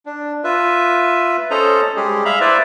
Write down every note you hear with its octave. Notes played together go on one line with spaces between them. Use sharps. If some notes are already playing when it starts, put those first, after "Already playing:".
D4
F4 B4 E5
C#4 A4 C5 D#5 A#5
G3 G#3 G4 G#4
E5 F5 A#5 B5
E4 B4 C5 D5 E5